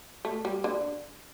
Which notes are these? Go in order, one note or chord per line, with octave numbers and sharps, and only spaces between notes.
A3
G3
D3